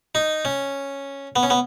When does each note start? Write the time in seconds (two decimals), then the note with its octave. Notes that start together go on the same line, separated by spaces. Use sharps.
0.15 D#4
0.45 C#4
1.36 B3
1.43 C#4
1.50 B3